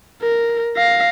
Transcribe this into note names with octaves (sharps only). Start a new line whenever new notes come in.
A#4
F5 A#6